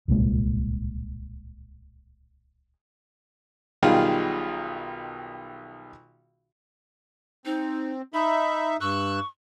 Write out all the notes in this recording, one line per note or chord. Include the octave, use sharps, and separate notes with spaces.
D1 C2 A#2 G#3
B1 D#3 G3 D#4 F4 G#4
C4 D#4
D#4 E5 B5
G2 C#6 E6 F#6